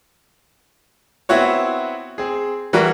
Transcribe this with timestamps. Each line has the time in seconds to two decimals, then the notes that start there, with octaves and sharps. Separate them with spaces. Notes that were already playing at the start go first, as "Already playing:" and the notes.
1.29 B3 C4 E4 F#4 C#5
2.18 C4 G#4
2.73 E3 G3 F#4 A#4